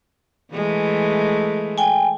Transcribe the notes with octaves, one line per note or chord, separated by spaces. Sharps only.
E3 G#3 A3
G5 G#5